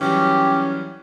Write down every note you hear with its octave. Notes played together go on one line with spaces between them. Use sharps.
E3 F#3 G3 C#4 G4